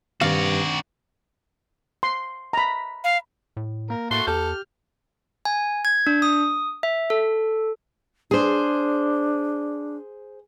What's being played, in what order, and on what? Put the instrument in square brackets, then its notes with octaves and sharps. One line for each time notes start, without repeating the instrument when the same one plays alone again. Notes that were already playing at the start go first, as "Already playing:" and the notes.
[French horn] G2 [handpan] D#3 C4 D4 [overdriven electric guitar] F#4 D5 [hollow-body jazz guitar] F5
[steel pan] C6
A#5 B5
[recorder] F5
[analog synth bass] A2
[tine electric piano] A#3 [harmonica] A#4
[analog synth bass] A2 [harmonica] A3 F#4 A5 [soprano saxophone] C6
[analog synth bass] E2 [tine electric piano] G4 G6 [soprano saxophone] A4 [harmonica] F6
[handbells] G#5
G#6
D4
D#6
E5
A4
[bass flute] D4 [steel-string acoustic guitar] G#4 C5